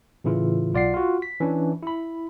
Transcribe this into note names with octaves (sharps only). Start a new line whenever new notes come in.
A2 C#3 E3 E4 F4
B1 F4 D5 F#5 C7
F4 F#4
B6
E3 C#4 D4
E4 B5